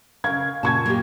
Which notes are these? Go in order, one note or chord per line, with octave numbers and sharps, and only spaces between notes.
C#3 A#4 F5 C#6 G#6
A#2 C#3 A5 C#6 G#6
A#3 F4 G4